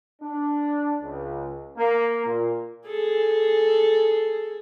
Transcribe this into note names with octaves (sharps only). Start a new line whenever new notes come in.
D4
C#2
A#3
A#2
G#4 A4